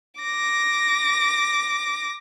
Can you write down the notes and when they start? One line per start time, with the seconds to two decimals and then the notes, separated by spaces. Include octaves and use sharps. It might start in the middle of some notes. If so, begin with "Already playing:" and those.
0.21 D6 A#6